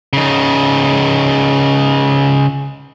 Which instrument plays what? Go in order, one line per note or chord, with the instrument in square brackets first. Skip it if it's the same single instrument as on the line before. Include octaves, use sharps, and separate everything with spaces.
[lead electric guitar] C#3 D#4